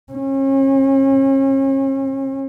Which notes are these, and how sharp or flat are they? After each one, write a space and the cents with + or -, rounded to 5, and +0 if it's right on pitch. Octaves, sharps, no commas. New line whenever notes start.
C#4 -40